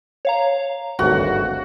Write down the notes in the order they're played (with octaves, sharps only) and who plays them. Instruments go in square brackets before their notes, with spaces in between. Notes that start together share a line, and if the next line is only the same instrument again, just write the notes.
[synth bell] C#5 F5 A#5
[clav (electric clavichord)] G#1 D2 G2 [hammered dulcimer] F#4